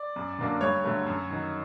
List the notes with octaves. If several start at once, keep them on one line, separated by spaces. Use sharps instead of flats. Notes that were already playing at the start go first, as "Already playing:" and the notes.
Already playing: D5
F#2
D3 F#3 A#3 D4
G2 C#5
D3 F#3 A3
F#2
D#3 F#3